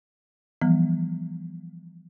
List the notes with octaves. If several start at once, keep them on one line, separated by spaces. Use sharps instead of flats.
E3 F3 G3 B3